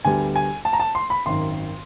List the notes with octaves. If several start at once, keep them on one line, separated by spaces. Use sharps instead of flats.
D2 D3 G3 B3 G#5
G#5
A5
A#5
A5
C6
B5
G#1 F#2 D#3 C6